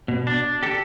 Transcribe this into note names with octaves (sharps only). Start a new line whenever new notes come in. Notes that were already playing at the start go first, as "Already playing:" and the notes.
B2
D4
G4 A4